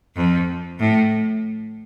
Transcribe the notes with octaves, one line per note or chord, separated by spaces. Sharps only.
F2
A2